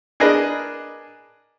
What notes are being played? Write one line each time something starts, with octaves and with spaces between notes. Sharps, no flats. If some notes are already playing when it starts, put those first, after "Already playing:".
D4 G#4 A#4 B4 D#5